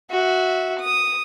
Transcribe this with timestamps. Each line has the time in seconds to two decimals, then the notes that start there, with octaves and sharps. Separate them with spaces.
0.10 F#4 E5
0.80 D#6